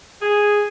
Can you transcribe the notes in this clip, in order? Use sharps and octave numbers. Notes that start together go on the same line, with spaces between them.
G#4